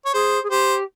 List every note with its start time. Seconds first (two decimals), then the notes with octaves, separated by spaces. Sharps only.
0.06 C#5
0.14 G#4 C5
0.43 G#4
0.50 G4 C5